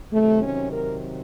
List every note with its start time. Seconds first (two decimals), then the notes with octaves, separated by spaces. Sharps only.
0.12 C3 D#3 F#3 A3
0.43 C#4
0.72 A#4